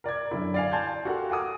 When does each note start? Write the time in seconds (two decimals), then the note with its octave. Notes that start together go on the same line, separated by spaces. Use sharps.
0.04 A#4 D5 D6 G#6
0.31 F#2 D3 E4
0.54 D5 F5 G#5
0.71 G#5 A5 C6 G6 G#6
1.05 F#4 G4 A4 A#4 F5 F#5
1.30 F#5 G#5 D6 D#6